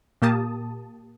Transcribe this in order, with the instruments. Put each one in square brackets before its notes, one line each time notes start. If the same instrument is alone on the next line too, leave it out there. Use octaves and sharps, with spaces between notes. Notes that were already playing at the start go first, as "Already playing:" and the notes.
[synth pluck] A#2 A#3 G4 A5 D#6